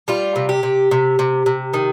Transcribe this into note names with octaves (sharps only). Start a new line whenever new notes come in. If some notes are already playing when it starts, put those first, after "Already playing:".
G3 F4
C3
G4
C3
C3
C3
C3
D#3